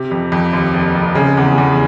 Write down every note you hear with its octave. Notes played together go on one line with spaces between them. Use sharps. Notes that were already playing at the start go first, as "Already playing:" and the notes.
Already playing: C3
F2
F2
D#2
F1
F1
C#3
E2
E2